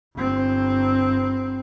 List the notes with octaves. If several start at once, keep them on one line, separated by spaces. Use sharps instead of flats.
G1 C4